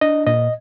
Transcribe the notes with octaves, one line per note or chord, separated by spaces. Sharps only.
D4 D#5
A#2 D#5